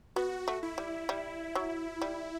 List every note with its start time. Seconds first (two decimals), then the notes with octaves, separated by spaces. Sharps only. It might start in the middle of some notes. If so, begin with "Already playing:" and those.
0.16 B3 F#4
0.48 A3
0.63 E4
0.78 G3
1.09 G3
1.55 F#3
2.02 G3